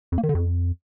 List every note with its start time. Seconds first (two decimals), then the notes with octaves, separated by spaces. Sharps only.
0.12 F2
0.18 A#3
0.23 D#3
0.29 D3
0.35 F2